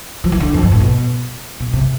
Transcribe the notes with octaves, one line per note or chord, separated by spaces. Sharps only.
F3
E3
D3
F2
G2
A2
B2
B2
C3